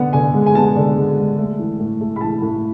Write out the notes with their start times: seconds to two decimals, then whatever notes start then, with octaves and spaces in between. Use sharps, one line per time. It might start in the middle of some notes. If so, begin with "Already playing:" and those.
Already playing: D3 B3 F#5
0.13 D3 G#5
0.34 G#3
0.46 G#5
0.55 B3 A5
0.76 D3
0.97 G#3
1.18 G#3
1.39 A3
1.59 E3
1.80 A2
2.01 A3
2.16 B5
2.21 E3 A5
2.42 A2